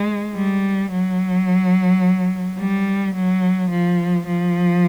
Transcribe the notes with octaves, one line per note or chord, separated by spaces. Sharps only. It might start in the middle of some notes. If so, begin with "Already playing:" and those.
Already playing: G#3
G3
F#3
G3
F#3
F3
F3